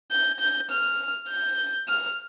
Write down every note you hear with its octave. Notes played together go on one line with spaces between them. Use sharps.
G6
G6
F6
G6
F6